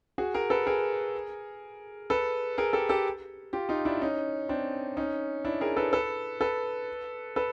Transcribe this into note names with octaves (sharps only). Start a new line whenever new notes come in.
F#4 G#4
G#4 A#4
A4 B4
G#4 A#4
A4 B4
G#4 A#4
G4 A4
G4 A4
F4 G4
D#4 F4
D4 E4
C#4 D#4
C4 D4
C#4 D#4
D4 E4
G#4 A#4
A4 B4
A4 B4
A4 B4
A4 B4